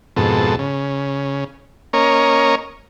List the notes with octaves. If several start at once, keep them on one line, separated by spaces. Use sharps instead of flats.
F2 G#2 B2 A4
C#3
A#3 C#4 A#4 C#5 D#5